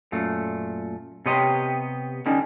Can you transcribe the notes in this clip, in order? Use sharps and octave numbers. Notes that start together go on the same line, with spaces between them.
F#2 A#2 A3
C3 B3 G4 C#5 D#5 C6
D3 G3 C#4 D#4